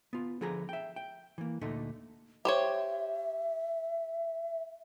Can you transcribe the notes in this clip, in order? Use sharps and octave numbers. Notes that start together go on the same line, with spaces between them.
B3 F4
D3 F3 G#4 B4 A#5
E5 G5
G5
E3 A#3
D2 A#2 D3 A3 D#4
G4 C5 C#5 E5